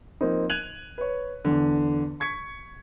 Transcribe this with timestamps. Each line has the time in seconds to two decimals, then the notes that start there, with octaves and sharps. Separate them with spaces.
0.21 F3 A#3 C4 D#4
0.50 F#6 G#6 D#7 F7 F#7
0.98 B4 C#5
1.45 E2 D3
2.20 C#6 G#6 B6 C#7